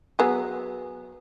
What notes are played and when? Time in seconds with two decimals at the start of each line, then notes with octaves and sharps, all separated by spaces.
0.19 F#3 B3 G#4